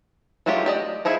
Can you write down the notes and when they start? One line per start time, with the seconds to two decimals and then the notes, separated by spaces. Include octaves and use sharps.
0.46 F#3 G#3 A3 F4 G4
0.66 G4 D5 D#5
1.05 F3 D#4 E4 G#4